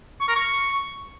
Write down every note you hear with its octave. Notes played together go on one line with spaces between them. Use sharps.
C#6
A#4
C#6